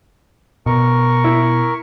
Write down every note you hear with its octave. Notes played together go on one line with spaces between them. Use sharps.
B2 A#4 C#6
E4